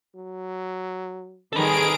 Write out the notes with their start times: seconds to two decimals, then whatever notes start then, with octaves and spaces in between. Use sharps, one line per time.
0.15 F#3
1.53 C3 D#3 G3 G#4 A4 B4 D7